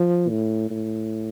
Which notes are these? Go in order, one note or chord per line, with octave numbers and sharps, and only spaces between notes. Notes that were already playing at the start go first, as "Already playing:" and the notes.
Already playing: F3
A2
A2